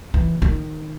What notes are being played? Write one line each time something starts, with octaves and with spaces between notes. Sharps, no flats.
E3
D#3